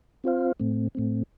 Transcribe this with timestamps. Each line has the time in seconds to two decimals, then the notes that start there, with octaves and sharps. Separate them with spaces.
0.24 C4 F4 C5 F5
0.60 A2 A3 C4
0.95 A2 A3 C4